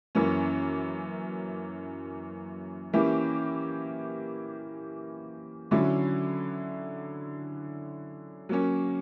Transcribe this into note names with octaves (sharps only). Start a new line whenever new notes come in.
F#2 E3 A#3 C#4
E3 A#3 C#4 E4 G4
D3 F#3 C#4 E4
F#3 A#3 C#4